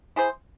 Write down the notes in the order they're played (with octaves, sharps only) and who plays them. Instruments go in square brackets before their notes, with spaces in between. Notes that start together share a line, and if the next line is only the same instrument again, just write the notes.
[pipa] E4 G#4 C5